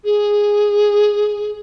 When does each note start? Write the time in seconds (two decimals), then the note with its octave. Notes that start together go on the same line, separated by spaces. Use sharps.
0.05 G#4